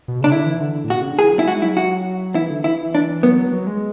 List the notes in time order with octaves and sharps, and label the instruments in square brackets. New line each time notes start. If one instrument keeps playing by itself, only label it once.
[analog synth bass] B2
[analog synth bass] C#3 [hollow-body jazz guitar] D4
[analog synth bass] D3 [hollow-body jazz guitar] E4
[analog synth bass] E3
D3
A2
[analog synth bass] B2 [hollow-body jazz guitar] F#4
[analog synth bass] C#3
D3
[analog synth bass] E3 [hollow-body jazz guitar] G#4
[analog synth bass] F#3
[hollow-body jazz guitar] E4
[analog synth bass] G#3 [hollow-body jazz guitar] F#4
[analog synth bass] F#3 [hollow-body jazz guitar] E4
[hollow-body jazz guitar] F#4
[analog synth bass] E3 [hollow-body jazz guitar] E4
[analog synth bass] D3
[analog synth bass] E3 [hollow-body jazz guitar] E4
[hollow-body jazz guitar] D4
[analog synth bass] F#3 [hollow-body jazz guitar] B3
[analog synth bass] F#3
F#3
G#3